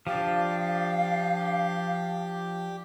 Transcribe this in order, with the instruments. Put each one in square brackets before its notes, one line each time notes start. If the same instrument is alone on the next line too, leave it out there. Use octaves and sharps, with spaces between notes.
[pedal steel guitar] F3 D4 [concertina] G4 [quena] F5